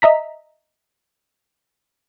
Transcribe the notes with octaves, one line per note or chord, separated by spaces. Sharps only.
D#5 E5 A#5 B6